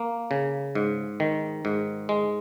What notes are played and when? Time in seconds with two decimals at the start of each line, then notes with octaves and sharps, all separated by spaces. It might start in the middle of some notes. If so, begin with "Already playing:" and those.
Already playing: A#3
0.31 C#3
0.75 G#2
1.20 D#3
1.65 G#2
2.09 G#3